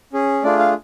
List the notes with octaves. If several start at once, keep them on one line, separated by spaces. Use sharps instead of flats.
C#4 G#4
A3 D4 F4 G#4 D5
F5